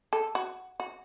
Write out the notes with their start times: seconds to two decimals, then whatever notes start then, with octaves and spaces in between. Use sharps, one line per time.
0.13 A4
0.35 F#4
0.80 F#4